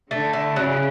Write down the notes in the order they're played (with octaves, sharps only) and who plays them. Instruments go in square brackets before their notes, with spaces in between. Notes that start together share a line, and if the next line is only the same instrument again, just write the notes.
[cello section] D3 [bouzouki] A3
[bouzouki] E4
[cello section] C#3 [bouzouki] F#3